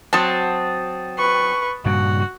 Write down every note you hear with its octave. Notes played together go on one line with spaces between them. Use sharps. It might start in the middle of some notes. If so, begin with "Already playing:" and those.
F#3 C4 A5 D#6
B4 C#6
G2 A#2 C#3 F#4